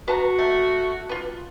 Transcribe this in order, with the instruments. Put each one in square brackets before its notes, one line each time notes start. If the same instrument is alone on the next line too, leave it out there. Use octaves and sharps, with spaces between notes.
[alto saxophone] F#4 [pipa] B4 A5 A#5
[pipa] A3
F4 B4